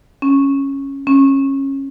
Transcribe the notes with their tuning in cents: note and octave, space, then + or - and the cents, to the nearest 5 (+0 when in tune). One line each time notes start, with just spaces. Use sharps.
C#4 -10
C#4 -20